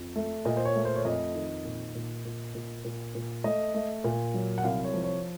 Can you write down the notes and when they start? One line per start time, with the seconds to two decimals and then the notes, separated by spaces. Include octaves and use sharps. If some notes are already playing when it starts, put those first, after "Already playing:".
Already playing: F2
0.16 A3
0.45 A#2 D#5
0.57 C5
0.65 C#5
0.76 A3
0.85 C5
0.96 C#5
1.05 F2 D#5
1.35 D#3
1.65 A#2
1.95 A#2
2.25 A#2
2.55 A#2
2.85 A#2
3.15 A#2
3.44 A3 D#5
3.74 A3
4.04 A#2
4.34 F#3
4.58 F#5
4.64 C2 F5
4.84 C#5
4.94 F3
5.04 C#5